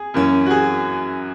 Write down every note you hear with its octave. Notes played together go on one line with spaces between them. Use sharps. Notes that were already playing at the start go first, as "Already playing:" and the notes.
Already playing: G#4
F#2 E3 A#3 C#4
F#4
G#4